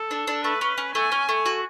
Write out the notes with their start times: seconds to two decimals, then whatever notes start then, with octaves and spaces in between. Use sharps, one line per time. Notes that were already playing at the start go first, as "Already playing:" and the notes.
Already playing: A4
0.11 D4
0.27 D4
0.44 A3 B4
0.61 C#4
0.78 C#4
0.95 A3 G#5
1.12 C#4
1.29 A3
1.46 F#4